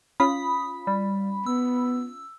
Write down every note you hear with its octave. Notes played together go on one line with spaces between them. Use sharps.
C#4 F4 B5 D#6
G3
B3 E6